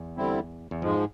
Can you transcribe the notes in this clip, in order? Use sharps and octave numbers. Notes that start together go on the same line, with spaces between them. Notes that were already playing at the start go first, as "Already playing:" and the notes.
Already playing: E2
D3 G3 C4 E4
E2
F2 G#2 F3 G#3